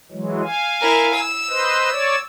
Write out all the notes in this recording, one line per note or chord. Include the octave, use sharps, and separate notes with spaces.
E3 F#3 G#3
F5 G#5
E4 A#4
E6
B4 C5 D#5
C#5 D5